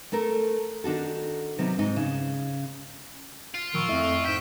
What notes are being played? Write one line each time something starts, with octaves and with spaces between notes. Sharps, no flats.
A3 A4 A#4
D#3 D4 F#4 A4
C3 D#3 F#3 B3
G#2 C4 D#4
C#3
F4
A2 D#3 F3 C#6 E6 D7
F2 A3 E4 E5
G#2 G5 B6 E7